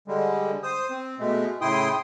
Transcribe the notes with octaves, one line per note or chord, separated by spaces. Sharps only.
D3 G3 G#3
C5 D#6
C4
B2 G#3 A3
A2 C#3 E4 G5 C6 D#6